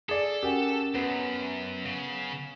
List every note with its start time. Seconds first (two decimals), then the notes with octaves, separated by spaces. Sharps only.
0.09 G#4 A4 D5
0.43 C#4 F#4 G4 A#4 G#5
0.95 F#2 B3
1.85 C#3